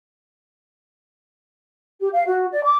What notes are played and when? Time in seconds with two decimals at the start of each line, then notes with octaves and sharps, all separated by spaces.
2.00 G4
2.13 F5
2.26 F#4
2.51 D5
2.63 D6